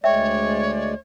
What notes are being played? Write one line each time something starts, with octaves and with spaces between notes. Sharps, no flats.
D2 G#3 C#5 D5 E5 G5